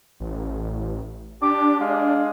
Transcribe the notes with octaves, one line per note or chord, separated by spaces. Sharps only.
A1
D4 G4 D6
G#3 F5